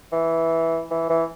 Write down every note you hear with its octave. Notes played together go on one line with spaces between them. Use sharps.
E3
E3
E3